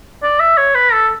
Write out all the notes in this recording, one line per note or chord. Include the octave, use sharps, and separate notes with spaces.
D5
E5
C#5
B4
A4